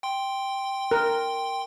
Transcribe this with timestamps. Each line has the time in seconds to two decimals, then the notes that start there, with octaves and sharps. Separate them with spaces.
0.03 G5 C6
0.91 A#4